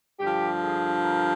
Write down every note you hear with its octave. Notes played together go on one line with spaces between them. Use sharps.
G2 D3 F3 G4
G#4
A#4